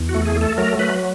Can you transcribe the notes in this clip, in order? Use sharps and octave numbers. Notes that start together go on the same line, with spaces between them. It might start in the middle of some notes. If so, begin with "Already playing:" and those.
Already playing: E2
F#4
A3
G#4
A3
A4
F#3 A#4
F#3 B4